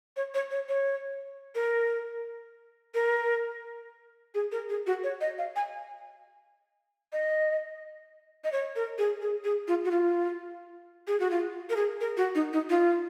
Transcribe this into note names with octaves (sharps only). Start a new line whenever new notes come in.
C#5
C#5
C#5
C#5
A#4
A#4
G#4
A#4
G#4
F#4
C#5
D#5
F5
G#5
D#5
D#5
C#5
A#4
G#4
G#4
G#4
F4
F#4
F4
G#4
F#4
F4
A#4
G#4
A#4
F#4
D#4
D#4
F4